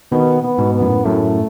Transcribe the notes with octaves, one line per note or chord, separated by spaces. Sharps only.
B2 D#3 B3
B3
G#2 B2
B3
F#2 A2
F#2 A2 A3